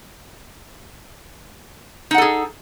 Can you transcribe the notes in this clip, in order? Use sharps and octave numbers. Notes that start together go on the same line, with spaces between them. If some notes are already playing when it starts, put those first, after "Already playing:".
D#4 G#4 A4 F#5